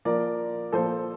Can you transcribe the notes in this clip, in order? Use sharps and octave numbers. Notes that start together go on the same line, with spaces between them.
A#2 F3 A#4 D5
A#2 F3 A4 C5